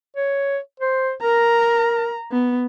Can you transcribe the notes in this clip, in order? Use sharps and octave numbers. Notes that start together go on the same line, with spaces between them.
C#5
C5
A#4 A#5
B3